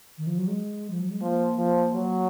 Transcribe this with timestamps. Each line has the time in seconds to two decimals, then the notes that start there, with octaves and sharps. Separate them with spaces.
0.18 D#3
0.26 F3
0.37 F#3
0.47 G#3
0.90 F3
1.00 F#3
1.10 G#3
1.21 F3 A#3
1.59 F3
1.95 F#3